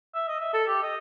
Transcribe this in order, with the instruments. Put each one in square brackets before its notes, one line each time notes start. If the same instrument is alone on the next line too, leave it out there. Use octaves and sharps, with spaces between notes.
[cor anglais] E5
D#5
E5
A4
G4
D#5